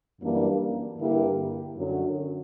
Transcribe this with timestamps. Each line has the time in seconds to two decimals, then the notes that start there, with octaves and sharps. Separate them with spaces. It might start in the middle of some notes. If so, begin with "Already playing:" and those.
0.20 F#2 E3 G3 A#3 D4
0.98 G2 D3 A#3 E4 G4
1.76 F#2 D3 F#3